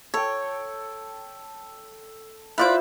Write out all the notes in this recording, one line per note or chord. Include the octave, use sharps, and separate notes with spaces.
A4 C#5 G5
E4 F4 B4 C5 D5 D6